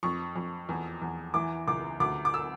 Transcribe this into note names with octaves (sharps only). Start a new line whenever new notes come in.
F2 C#6
F2
E2
E2
E3 D6
C#2 D6
D2 D6
D6
E6